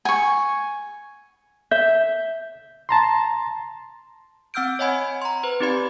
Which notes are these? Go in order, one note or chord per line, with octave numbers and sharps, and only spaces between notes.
G#5 C#6
E5 G6
A5 A#5 C6
C4 F#5 E6 F6 G6 D7
C#5 D#5 F#5 G#5 B5 G#6
A#5 C6
B4 C5
C4 D#4 G4 D5 B5 G#6